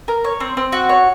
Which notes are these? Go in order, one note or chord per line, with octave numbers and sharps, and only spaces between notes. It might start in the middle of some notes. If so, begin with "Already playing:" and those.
A#4
C#5
C4
C4
F#4
C#5